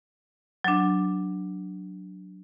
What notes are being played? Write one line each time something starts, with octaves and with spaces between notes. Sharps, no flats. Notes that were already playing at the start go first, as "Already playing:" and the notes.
F#3 D4